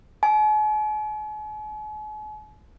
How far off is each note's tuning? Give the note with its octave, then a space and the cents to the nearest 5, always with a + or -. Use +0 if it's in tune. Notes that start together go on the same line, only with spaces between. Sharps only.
G#5 +45